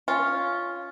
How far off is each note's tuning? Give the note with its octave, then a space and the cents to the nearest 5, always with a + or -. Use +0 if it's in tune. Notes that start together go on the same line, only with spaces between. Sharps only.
C#4 +0 F4 +0